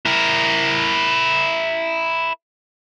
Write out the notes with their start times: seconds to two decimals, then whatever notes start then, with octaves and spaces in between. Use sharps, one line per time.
0.06 E4 A#4